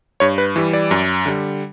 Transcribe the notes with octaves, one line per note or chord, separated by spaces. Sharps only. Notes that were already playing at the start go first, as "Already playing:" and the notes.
G2 C#5
B4
E3 G3
D5
F#2
D3 G3